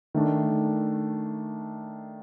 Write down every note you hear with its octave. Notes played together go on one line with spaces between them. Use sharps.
D#3 A3 D4